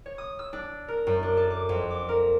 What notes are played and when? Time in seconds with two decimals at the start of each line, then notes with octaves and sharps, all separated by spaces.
0.06 C#5
0.18 D#6
0.39 E6
0.53 D4
0.88 A#4
1.07 F#2
1.23 D4
1.37 A4
1.50 D6
1.69 F2
1.90 D6
2.09 A#4